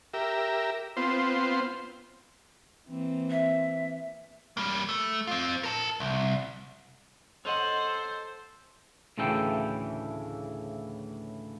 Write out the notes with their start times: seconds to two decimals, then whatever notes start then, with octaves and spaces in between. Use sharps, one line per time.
0.14 G4 A#4 E5
0.97 B3 C4 F4 C5
2.88 E3 A#3 C4
3.30 E5
4.57 G3 A#3
4.89 A3
5.27 C4 F4
5.64 A#4 A5
6.00 C2
7.45 A4 C5 C#5 D#5 F#5
9.18 D2 A2 C#3 E3 A4 G5